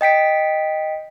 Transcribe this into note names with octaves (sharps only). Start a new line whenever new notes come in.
D#5 G5 B6 D7